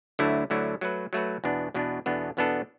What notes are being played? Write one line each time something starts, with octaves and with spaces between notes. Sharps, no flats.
D2 D3 F#3 A3 E4
D2 D3 F#3 A3 E4
F#3 A3 F#4 B4
F#3 A3 F#4 B4
E2 B2 B3 D4
E2 B2 B3 D4
E2 B2 B3 D4 A4
E2 B2 B3 D4 A4